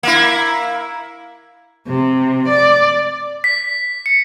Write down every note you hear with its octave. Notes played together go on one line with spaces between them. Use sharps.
A#3 E4
C3
D5
B6
C#7